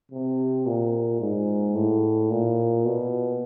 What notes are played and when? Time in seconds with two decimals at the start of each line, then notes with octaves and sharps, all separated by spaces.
0.11 C3
0.66 A#2
1.21 G#2
1.75 A2
2.31 A#2
2.85 B2